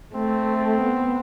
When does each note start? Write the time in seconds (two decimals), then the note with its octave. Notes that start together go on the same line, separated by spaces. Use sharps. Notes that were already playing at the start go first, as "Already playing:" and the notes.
0.15 A3 C4
0.79 B3